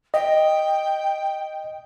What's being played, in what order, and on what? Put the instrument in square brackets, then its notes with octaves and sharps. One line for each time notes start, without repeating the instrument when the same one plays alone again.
[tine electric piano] D#5 [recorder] G5